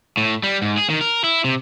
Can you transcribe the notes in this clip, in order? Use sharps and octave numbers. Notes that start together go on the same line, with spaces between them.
A2
G3
G#2
G#4
D#3
A#4
E4
C3